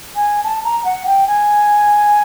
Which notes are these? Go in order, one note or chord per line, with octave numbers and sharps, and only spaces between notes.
G#5
A5
A#5
F#5
G5
G#5